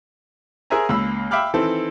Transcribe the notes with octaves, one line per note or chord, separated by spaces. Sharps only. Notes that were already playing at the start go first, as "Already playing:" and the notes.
G#4 A#4 C5 E5 G#5 A#5
C#2 A#3 B5 E6
E5 F5 G5 B5 D6 F6
D#3 E3 C4 E4 A4